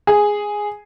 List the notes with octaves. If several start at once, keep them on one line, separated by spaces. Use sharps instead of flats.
G#4